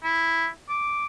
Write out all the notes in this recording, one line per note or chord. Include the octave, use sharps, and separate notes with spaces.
E4
D6